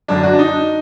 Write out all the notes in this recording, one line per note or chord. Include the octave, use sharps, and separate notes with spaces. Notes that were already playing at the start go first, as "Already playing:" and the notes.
F#2 D3 D4
F#4
D4
D#4